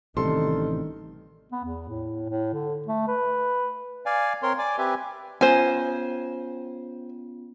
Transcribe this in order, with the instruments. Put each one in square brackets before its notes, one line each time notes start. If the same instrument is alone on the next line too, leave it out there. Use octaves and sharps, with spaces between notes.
[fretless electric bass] A1 C3 G3 [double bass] D#3 [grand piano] A4 C6
[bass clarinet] B3
E2
A2
A2
D3
A3
B4
[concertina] D5 F5 G#5
C4 A#4 C#5 C6
D5 G#5 D6
C4 G4 B4 E5 G#5
[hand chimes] B3 C#4 F4 [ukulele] C5 G#5